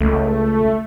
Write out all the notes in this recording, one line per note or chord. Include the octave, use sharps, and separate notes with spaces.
C#2 A3